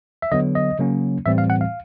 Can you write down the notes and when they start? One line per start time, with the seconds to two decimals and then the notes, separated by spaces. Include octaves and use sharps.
0.22 E5
0.32 D3 F#3 B3 D#5
0.55 D#5
0.79 C#3 F#3 A#3 C#4
1.26 A2 E3 G3 C4 E5
1.38 F5
1.50 F#5
1.61 F5